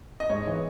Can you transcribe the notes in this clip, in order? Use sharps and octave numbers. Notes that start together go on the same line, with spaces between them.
D#5
G#2 C#5
E3 B3